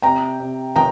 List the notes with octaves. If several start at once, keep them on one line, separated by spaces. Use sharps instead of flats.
C3 G5 A#5
C3
D#3 G5 A#5